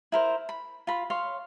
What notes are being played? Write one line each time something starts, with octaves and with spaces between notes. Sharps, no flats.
E4 A#4 C5
B5
F4 B5
C#5 F5 C6